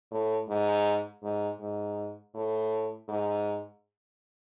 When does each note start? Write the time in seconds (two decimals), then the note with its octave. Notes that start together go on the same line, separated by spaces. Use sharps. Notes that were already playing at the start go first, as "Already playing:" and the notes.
0.11 A2
0.49 G#2
1.22 G#2
1.60 G#2
2.35 A2
3.09 G#2